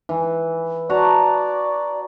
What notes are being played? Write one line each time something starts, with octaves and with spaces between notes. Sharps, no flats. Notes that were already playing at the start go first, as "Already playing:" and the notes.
E3
F#4 D5 A5 A#5